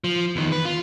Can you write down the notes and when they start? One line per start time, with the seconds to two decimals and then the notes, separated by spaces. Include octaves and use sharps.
0.04 F3
0.36 E2 D#3
0.52 B4
0.65 F4